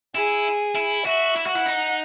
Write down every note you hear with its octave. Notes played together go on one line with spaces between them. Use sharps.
E4 G#4
E4
F#4 E5
E4
F#4
F#5
E4
D#4